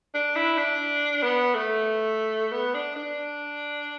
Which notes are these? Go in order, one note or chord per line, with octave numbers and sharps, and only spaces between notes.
D4
E4
D4
B3
A3
B3
D4
D4